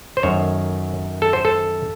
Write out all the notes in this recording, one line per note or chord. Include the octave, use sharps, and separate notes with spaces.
C5
F#2 D#3 A3 C#5
A4
C5
A4